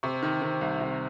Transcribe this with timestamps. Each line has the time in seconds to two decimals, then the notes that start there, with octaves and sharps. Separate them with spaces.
0.03 C3 C#6
0.22 D#3
0.42 D#3
0.61 C2
0.81 C3